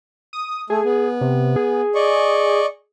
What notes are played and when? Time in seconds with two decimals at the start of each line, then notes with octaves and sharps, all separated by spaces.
0.33 D#6
0.70 A3 G#4
0.84 B3
1.21 C3
1.56 G#4
1.95 D5 D#5 C#6